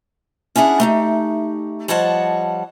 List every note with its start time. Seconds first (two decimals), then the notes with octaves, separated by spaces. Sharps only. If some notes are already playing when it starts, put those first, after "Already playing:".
0.56 C#4 D4 E4 G#4 F#5
0.80 A3 D#4 G4
1.88 F3 G3 C#5 D#5 F#5 A5